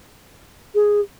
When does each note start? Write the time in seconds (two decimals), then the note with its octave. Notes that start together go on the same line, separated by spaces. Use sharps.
0.75 G#4